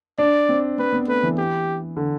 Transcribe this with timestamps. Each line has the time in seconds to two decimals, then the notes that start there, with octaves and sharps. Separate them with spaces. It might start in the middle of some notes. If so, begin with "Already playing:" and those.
0.18 D4 D5
0.49 C4
0.78 C4 B4
0.93 B3
1.07 A3 B4
1.23 E3
1.38 G4
1.97 D3